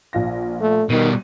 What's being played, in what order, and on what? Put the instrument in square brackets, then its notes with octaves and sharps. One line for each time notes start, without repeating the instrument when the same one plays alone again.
[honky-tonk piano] A#1 F4 A#6
[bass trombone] A3
[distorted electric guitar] B2 G3 [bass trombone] D#3 [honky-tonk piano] D#7